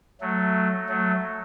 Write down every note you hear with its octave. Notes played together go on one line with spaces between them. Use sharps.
F#3 A3
F#3 A3